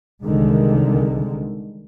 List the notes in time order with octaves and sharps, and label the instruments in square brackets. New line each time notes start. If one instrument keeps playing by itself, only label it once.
[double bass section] C2 D3 D#3 G#3